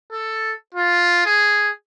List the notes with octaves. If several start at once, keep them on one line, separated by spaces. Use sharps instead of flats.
A4
F4
G#4